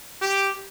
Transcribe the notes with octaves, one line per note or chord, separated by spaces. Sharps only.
G4